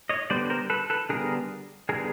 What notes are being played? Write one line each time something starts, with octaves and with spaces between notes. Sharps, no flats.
C#5 D#5
D3 G3 B3 C5 D5
A#4 C5
A4 B4
A4 B4
D3 G3 B3 G#4 A#4
D3 G3 B3 G#4 A#4